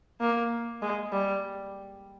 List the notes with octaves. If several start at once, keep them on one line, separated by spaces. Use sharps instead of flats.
A#3
G#3
G3